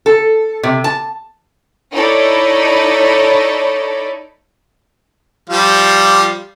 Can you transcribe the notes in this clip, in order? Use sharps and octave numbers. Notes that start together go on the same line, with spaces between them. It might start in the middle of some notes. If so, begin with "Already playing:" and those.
A4
C3
A5
D#4 E4 A4 C#5 D5 B5
F3 G3 F4